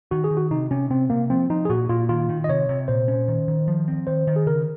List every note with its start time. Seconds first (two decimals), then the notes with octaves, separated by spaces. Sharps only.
0.11 D#3 F#4
0.24 G#4
0.31 D#3
0.37 F#4
0.51 C3 D#4
0.71 C3 C#4
0.90 C3 C4
1.10 C3 A#3
1.30 F3 C4
1.50 F3 D#4
1.65 G#4
1.70 A#2 F#4
1.89 A#2 F4
2.09 D#3 F4
2.29 D#3
2.44 D#5
2.49 C3 C#5
2.69 C3
2.88 A#2 C5
3.08 C#4
3.28 D#3
3.48 D#3
3.68 F3
3.88 C4
4.07 D#3 C5
4.27 D#3
4.36 G#4
4.47 C#3 A#4